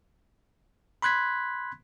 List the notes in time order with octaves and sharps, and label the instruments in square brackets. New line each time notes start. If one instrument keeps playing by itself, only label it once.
[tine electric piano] B5 C6 F#6 G#6 B6